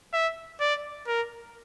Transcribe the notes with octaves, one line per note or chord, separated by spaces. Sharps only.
E5
D5
A#4